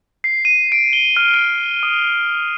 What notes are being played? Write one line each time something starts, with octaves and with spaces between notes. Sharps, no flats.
C7
D#7
D7
G7
F6
D7
D#6